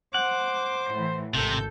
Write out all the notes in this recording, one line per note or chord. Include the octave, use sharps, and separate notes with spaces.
C5 F#5 D6
A2 E3
G#1 C3 A4 G6